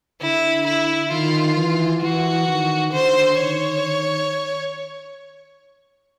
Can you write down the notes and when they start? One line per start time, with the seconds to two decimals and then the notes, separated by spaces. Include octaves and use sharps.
0.21 D3 E4
0.66 E4
1.11 D#3 F4
1.57 E3
2.02 E3 F#4
2.48 D#3
2.93 D3 C5
3.38 D#3 C#5
3.83 D#3